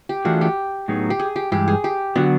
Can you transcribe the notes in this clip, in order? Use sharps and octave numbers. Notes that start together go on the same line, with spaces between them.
G4
E3 A3 D4 F4 F#4 G#4
G4
A2 F#3 B3 D#4 G#4
G4
G#4
G4
G2 E3 G#3 G4
G#4
G4
D3 F#3 B3 D4 F#4